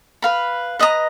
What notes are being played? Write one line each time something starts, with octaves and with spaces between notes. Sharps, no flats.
B4 F5 B5
B4 D#5 A#5 D#6